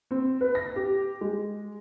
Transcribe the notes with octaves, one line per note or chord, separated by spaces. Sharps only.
C4
B4
A#6
G4
G#3